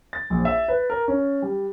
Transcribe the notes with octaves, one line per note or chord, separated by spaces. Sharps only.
A6
A#1
E5
B4
A#4
C#4
G3